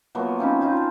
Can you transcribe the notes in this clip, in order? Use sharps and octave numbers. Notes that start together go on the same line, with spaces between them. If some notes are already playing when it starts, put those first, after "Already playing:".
F3 F#3 A#3 B3
C4 C#4 D#4 B5
D#4 F4 C5
A5